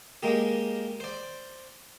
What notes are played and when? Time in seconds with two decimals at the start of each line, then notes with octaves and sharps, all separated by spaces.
0.23 G#3 A#3 G4
1.00 C5 D5